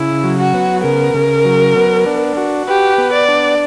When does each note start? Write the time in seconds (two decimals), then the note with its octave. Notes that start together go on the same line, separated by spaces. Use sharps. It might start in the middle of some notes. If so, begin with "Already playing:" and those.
Already playing: C#3 E4
0.24 F#3
0.38 F#4
0.54 B3
0.84 C#3 A#4
1.14 C#3
1.45 F#3
1.76 B3
2.06 D4
2.37 F#4
2.68 G4 B4
2.98 B3
3.13 D5
3.28 D4